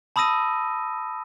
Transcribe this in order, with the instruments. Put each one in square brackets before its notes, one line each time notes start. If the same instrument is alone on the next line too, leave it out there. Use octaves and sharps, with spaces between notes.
[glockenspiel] A5 B5 D#6 E6 A#6 D#7